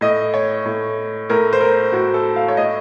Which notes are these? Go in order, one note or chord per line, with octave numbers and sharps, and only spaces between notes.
A2 D#5
C#5
A2
A2 A#4
C5
A#4
A2 F#4
A4
F5
C#5
A2 D#5